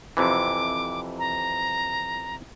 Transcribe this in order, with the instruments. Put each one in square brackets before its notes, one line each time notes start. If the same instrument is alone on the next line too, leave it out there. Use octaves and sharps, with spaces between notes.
[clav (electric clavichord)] F2 C3 E3 [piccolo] D6
[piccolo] A#5